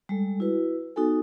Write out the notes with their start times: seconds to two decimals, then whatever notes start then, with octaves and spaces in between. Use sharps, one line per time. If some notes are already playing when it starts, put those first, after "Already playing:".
0.09 G3 G#3 A4
0.40 E4 F#4 B4
0.96 B3 D#4 F#4 A4 G#5